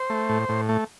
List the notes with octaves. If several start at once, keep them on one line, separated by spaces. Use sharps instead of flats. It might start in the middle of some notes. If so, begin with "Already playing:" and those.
Already playing: C5
A3
A2
A2
A3